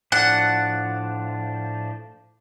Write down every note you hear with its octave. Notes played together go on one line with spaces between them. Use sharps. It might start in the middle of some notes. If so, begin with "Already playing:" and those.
A2 F3 D4 F#5